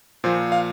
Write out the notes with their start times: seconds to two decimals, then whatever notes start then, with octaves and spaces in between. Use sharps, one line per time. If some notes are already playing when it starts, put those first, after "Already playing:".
0.24 A#2 F3 C5
0.52 F5